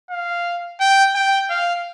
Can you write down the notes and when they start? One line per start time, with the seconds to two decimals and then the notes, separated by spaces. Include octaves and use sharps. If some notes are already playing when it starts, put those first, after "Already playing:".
0.10 F5
0.80 G5
1.15 G5
1.50 F5